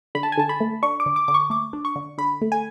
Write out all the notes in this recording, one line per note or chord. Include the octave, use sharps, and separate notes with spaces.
D3 B5
A5
G#5
D3 A5
B5
A3
D4 C#6
D6
D3
D6
D3 D6
C#6
A3 D6
D4
C#6
D3
D3 B5
A3
G#5